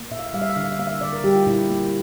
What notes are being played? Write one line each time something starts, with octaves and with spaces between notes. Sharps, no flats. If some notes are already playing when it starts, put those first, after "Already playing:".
Already playing: A#3
A#2 E5
F5
E5
G3 F5
E5
F5
D3 E5
F5
E5
A#3 F5
E5
D3 D5
A#4
G3 G4
F4
A#2 E4
A#3